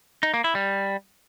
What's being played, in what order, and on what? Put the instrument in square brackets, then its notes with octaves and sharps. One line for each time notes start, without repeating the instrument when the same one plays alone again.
[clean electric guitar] D#4
A#3
E4
G3